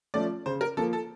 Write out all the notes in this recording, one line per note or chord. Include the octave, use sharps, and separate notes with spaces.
F3 A3 C#4 D5
C#3 C5
A#4
F3 A#3 A4
A4